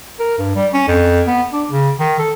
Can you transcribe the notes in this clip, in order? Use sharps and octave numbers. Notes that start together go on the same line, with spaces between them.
A#4
G2
G3
C#4
F2
B3
D4
C#3
D#3
A4